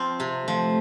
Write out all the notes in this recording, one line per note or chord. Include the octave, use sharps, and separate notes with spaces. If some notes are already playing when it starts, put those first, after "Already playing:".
Already playing: F3 C4 F4
C3
F3 A3